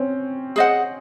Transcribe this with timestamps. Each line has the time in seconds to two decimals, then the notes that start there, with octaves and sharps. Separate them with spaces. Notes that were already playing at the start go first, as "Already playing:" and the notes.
Already playing: C4 C#4
0.56 G#4 C5 D#5 F#5